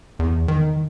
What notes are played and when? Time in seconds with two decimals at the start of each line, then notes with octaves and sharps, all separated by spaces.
0.19 E2
0.48 D#3